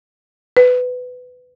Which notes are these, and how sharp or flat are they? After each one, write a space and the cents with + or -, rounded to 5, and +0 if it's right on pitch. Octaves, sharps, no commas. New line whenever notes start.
B4 +15